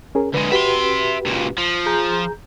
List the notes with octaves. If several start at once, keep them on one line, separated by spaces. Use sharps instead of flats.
C#4 G#4 A#4
D3 G#3 B4
F#4 G4 B4 E5 C6
C#2 A#2
F3
G#4 A#5 G6